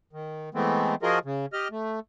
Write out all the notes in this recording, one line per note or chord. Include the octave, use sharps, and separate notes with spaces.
D#3
E3 G#3 A3 B3 C4
F3 F4 F#4 G#4 A#4 D#5
C#3
G4 D#5 F6
A3